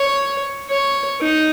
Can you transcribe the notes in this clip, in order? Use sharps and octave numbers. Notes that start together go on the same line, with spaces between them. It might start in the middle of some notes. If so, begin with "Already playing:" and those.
Already playing: C#5
C#5
D#4